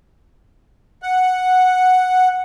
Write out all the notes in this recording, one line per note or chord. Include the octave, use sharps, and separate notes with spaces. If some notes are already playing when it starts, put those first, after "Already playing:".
F#5